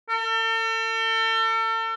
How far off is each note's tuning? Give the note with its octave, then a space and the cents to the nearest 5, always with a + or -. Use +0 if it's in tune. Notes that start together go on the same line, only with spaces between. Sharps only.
A4 +40